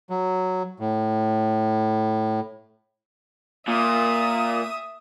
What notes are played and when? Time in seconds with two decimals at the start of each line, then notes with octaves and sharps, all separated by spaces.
0.10 F#3
0.80 A2
3.68 A#2 E5 D#6